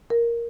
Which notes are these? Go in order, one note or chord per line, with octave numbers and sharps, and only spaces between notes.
A#4